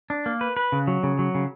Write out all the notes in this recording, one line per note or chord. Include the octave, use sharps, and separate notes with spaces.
D4
A#3
B4
B4
C#3
F#3
C#3
F#3
C#3